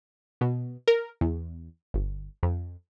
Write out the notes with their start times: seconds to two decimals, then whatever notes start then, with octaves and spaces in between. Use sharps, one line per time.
0.41 B2
0.88 A#4
1.21 E2
1.94 G1
2.43 F2